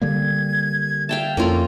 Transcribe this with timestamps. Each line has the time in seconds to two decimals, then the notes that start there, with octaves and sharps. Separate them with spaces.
0.01 D3 G3 A#3 G#6
1.09 E5 F5 G5 A5
1.37 F2 A#3 C#4 F4 A4